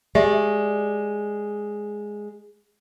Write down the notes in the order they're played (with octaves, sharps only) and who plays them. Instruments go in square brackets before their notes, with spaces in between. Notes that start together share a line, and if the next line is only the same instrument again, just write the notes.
[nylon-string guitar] G#3 D5 [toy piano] G4 E5